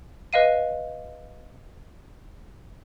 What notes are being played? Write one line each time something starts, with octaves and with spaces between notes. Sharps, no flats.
B4 D#5 F5 D#7